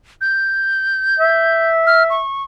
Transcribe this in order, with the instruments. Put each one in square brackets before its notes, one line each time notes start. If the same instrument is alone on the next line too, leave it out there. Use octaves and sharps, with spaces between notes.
[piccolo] G6
[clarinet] E5
[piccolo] F6
C#6